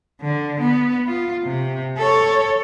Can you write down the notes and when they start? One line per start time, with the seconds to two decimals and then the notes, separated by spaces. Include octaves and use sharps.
0.21 D3
0.60 B3
1.07 F4
1.45 C3
1.97 A4 C#5